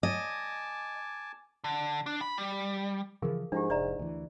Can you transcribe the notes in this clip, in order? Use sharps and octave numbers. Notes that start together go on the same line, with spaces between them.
D#5 G#5 A5 D6
D3
D4
B5
G3
C#3 E3 F3 G#4 A#4 F5
G#2 F3 G#3 D4 E4 G4
F1 D5 E5 A#5
D2 E3